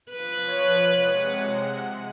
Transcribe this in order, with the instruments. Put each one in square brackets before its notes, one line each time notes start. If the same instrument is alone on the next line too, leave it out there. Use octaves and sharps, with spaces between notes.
[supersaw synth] F3 [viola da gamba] B4
[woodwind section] C#5
[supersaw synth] C3 G#3 F#5